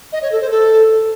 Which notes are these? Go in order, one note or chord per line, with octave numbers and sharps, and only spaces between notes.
D#5
C#5
A4
C5
A4